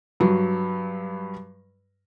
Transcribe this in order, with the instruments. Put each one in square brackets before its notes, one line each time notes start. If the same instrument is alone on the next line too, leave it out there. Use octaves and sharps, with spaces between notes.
[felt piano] G2 F#3